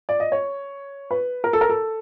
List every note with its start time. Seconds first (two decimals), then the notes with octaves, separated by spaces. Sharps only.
0.09 D5
0.20 D#5
0.32 C#5
1.11 B4
1.44 A#4
1.53 A4
1.61 A#4
1.69 A4